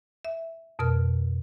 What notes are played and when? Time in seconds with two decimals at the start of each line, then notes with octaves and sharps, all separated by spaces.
0.25 E5
0.79 F2 B2 A#4 F6